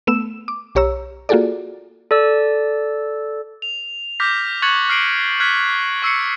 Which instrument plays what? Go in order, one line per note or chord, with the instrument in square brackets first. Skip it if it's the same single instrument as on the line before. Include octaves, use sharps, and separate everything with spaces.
[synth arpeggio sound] A3 B3 E6 E7
D6
B1 G4 C#5 A#5 E6
A#3 F4 F#4 G#4 A4 D5
[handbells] A4 D5 E6
[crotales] F7
D6 F6 G6 A#6 B6
C#6 F#6 G#6 A6 C#7 F#7
F6 C7 D7 F#7
F6 F#6 G#6 B6
C#6 E6 C7 C#7